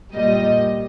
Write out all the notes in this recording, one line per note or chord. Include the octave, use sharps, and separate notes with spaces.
A#2 G3 D#5